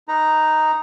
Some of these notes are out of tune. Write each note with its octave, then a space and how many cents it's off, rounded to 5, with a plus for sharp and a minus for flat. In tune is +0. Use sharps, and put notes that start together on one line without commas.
D#4 +0 B4 +0 A#5 +0